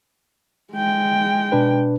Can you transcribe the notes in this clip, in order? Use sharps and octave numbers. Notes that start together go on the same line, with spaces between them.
G#3 G5
B2 D4 B4